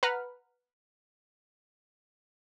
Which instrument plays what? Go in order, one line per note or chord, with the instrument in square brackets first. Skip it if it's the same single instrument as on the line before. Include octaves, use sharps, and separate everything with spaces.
[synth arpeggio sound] B4 F#5 A#5 B5 F6